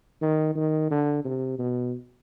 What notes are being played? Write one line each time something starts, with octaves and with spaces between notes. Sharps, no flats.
D#3
D#3
D3
C3
B2